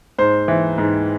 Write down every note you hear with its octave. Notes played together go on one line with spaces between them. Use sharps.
G#2 C5
E3
G#2